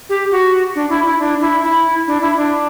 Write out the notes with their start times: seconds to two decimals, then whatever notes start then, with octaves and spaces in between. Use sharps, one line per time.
0.09 G4
0.31 F#4
0.75 D4
0.90 E4
1.05 E4
1.19 D4
1.41 E4
1.63 E4
2.07 D4
2.21 E4
2.37 D4